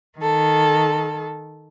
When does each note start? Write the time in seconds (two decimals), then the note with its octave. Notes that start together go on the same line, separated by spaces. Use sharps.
0.18 D#3 A4